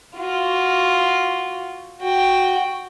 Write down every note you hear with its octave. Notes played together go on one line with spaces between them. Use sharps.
F4 F#4
F#4 G5